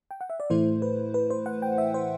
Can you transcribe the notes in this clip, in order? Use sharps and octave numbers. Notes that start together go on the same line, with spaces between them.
G5
F#5
E5
D5
A2 E3 A3 E4 C5
B4
B4
C5
F#5
G5
E5
C5